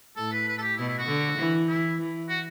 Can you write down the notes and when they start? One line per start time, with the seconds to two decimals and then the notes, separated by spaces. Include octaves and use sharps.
0.16 A2 A4
0.32 B4
0.48 B4
0.58 A4
0.62 G4
0.77 B2 E4
0.87 E4
0.98 F#4
1.07 D3
1.37 E3
1.68 E4
1.99 E3
2.29 F#4